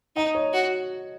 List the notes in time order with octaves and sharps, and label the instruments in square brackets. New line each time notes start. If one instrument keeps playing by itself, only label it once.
[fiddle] D#4 [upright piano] D#5
[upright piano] C#5
[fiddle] F#4